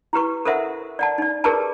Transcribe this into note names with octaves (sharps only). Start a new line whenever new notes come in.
E4 G4 B4 C#6
A4 A#4 C5 E5 F#5
D5 F#5 A5
D#4 D5
G4 G#4 A#4 B4 D5 A5